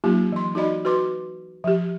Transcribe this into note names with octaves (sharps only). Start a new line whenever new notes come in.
F#3 A#3 D#4 F4 G4
E3 C6
D#4 F#4 D5 D#5 B5
F#4 B4 C6 D6
F3 G4